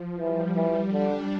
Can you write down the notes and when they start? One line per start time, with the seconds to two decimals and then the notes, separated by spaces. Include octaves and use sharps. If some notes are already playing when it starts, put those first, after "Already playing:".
Already playing: F3
0.18 E3 G3
0.55 E3 G3
0.91 D3 D4